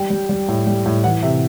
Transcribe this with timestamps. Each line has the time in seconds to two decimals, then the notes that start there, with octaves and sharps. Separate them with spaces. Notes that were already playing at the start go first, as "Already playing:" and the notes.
Already playing: G3 G5
0.10 G3
0.29 G3
0.48 A2
0.67 G3
0.86 A2
1.04 E3 F#5
1.23 C3 E5